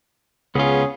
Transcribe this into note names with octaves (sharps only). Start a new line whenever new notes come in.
C#2 B3 C#4 F4 G#4